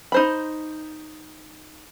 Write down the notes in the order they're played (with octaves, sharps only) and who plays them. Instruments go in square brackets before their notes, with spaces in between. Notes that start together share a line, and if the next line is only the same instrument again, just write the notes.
[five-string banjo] D#4 C5 B5